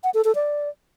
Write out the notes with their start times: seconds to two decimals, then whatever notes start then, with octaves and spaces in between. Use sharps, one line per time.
0.04 F#5
0.14 A4
0.25 A4
0.35 D5